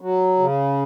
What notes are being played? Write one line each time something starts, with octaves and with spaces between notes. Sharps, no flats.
F#3
C#3